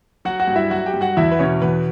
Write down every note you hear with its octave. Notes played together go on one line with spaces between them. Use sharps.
F#3 F#4 F#5
F#4 F#5
G2
E4 E5
F#3 F#4 F#5
G4 G5
G2
F#4 F#5
E2 E4 E5
B4
B2 C#4 C#5
E2 B4